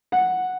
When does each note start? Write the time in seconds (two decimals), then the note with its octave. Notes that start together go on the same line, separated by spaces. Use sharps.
0.12 F#5